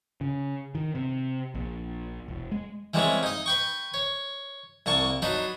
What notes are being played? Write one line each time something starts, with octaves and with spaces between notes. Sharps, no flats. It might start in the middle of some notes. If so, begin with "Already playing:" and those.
C#3
D#3
C3
A#1
E1
G#3
E3 G3 G#3 A#3 C4 C#4
D#4 D#5
B4 G5 C#6
C#5
C2 A#3 A5 C#6
F#3 D4 D#4 B4